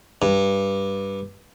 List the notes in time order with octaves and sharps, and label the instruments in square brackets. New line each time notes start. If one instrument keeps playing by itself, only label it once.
[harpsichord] G2